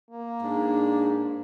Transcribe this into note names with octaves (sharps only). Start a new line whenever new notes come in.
A#3
G#2 D4